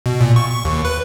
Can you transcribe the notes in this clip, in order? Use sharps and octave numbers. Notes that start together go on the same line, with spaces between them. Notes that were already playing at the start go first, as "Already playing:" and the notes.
B2
A#2
C#6
C#6
D#2
B4